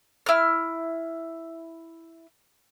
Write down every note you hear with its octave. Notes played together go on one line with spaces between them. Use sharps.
E4 F6